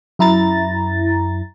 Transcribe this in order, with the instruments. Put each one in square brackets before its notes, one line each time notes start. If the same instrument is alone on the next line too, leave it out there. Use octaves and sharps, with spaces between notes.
[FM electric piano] F#2 E4 A#5 A6